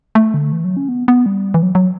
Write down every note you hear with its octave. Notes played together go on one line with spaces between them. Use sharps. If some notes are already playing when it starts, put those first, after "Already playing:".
A3
D3
E3
F#3
C#4
B3
B3
G3
E3
F#3
F#3